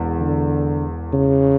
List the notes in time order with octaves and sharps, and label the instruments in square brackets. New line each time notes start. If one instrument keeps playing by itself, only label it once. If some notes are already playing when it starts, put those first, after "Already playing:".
Already playing: [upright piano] E1 E2
[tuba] D3
C#3